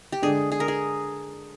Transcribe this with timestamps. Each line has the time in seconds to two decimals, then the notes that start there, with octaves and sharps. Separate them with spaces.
0.12 G4
0.22 D3 G#3 D4 G#4
0.52 G#4
0.60 A#4
0.68 G#4